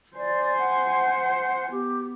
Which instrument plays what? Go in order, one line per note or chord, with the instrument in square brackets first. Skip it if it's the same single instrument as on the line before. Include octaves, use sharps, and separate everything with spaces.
[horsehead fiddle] C5 G#5 [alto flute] D5
[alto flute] F#5
[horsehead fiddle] B3 [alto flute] G4